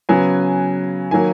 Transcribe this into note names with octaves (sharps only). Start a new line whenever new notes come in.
C#3 F#3 B3 G#5
D#3 F#3 A#3 G#5